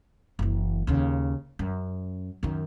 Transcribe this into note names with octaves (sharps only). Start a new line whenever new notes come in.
F#1 E3
D#2 C#3
F#2
F#2 D#3